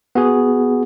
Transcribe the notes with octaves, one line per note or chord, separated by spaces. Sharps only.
B3 F#4 G#4